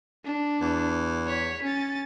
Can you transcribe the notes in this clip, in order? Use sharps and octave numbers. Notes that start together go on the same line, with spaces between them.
D4
E2
C#5 B6
C#4 A6